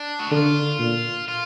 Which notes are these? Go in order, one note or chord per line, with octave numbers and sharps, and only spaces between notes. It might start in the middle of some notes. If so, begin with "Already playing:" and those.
Already playing: D4
F#4
D3 F4
A#2
F4